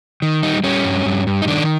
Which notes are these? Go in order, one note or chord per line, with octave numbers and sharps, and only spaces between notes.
D#3
G3 D#4
G3 C#4
G2
G2
G2
D#4
D#3 D4